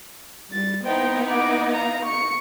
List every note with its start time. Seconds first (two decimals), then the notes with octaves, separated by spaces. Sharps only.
0.53 G3 A6
0.85 B3 D#4 E4 C5 G5
1.27 F#5 D6
1.73 F5 A#5
2.05 C#6 C#7